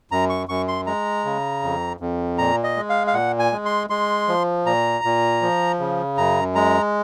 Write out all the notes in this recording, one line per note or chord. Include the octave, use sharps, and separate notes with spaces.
F#2 A#5
C#6
F#2 C#6
C6
G#3 A#5
C#3
F2
F2
A#2 A#5
D#5
G#3
F5
F5
A#2 F#5
G#5
G#3
C6
G#3 C6
F3
A#2 A#5
A#2
F3
C#3
F#2 A#5
G#3 A#5